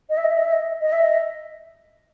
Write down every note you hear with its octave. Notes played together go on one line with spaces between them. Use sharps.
D#5
E5
D#5
E5
D#5
E5
D#5
D#5
E5
D#5